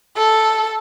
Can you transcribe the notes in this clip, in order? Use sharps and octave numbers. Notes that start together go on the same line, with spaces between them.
A4